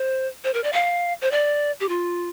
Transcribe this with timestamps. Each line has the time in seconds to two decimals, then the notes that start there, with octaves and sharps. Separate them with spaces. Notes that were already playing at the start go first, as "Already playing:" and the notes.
Already playing: C5
0.44 C5
0.54 A#4
0.64 D5
0.73 F5
1.22 C5
1.31 D5
1.80 G4
1.89 F4